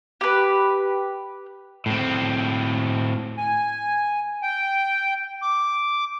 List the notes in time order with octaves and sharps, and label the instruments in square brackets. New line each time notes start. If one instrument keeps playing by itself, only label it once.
[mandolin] G4 B4
[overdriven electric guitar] A2 C4
[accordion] G#5
G5
D6